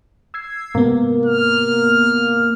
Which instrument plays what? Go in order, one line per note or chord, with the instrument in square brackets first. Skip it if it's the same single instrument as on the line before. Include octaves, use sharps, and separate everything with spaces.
[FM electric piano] E6 G#6 C7
[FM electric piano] G#2 C3 B3 [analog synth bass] A#3
[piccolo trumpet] F6